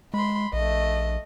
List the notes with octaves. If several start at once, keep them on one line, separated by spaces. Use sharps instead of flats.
G#3 B5 C6
A#1 A3 D#5